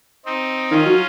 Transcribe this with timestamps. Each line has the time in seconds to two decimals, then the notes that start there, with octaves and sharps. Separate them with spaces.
0.25 C4 D#4
0.71 D#3 C#4 F4
0.86 F#3